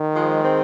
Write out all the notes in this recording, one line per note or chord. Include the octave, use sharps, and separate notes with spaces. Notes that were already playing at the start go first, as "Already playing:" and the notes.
Already playing: D#3
F3 G#3
G#3 C4